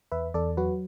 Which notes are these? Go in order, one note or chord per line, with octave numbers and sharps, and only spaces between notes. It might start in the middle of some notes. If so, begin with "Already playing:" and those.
E2 B4 E5
E2 A4 D5
F#3 F#4 B4